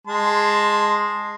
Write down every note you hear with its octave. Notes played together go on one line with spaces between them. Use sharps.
G#3 A5 C6